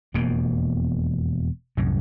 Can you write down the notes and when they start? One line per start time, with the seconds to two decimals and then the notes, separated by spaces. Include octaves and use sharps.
0.14 E1 F2 B2 A#3
1.77 C2 F#2 A2